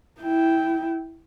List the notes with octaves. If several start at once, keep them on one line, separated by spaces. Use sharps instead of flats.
E4 G5